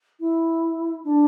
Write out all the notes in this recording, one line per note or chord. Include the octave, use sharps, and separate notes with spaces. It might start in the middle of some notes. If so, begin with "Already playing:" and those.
E4
D4